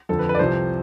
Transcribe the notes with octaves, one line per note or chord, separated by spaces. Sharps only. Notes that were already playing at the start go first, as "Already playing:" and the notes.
F2 D3 F3 A4
B4
B4
D5
C2 C3 F3 C5